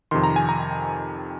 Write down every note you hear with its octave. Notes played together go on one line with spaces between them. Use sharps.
F2 C3 D#3 C6
A#5
G#5
A#5